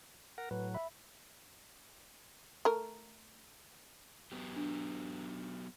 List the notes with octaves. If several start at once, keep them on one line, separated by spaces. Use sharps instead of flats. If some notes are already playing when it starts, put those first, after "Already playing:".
A#4 F#5
A2 F#3 B4
E5 B5
A3 A#4
F#3 B3 G4
D4